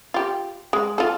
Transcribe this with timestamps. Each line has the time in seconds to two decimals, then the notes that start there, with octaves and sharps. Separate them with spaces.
0.14 F4 G4
0.73 G#3
0.98 F4 A4